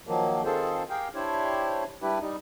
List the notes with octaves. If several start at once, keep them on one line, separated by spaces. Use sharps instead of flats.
D#3 F3 F#3 A#3
D#3 C4 F4 G#4 A4 C5
G4 G#4 A#4 F5 G5
D4 E4 G4 C5 C#5
G3 D4 E4 G4 B4
G3 D#4